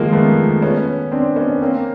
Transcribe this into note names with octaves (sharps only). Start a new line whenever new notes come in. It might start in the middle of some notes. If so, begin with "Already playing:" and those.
Already playing: D#3 F3 G#3 A#3
A3 B3
B3 C#4
C4 D4
B3 C#4
A#3 C4